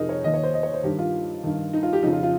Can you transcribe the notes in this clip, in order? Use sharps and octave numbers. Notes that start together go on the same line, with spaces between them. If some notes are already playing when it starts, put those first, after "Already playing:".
Already playing: F2 C3 F3 D#4 G#4 A#4 D#5
C#5
D#2 D#3 D#5
C#5
C5
D#5
C#5
C5
G2 D#3 G4
F4
G2 D#3
D#4
F4
G4
F2 C#3 F3 D#4
F4
F4